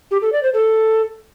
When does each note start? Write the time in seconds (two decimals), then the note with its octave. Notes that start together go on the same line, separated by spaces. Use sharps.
0.11 G4
0.22 A4
0.32 D5
0.43 C5
0.54 A4